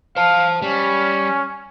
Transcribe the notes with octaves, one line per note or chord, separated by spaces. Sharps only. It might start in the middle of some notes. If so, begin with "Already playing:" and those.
C5 F5 A5
G3 C#4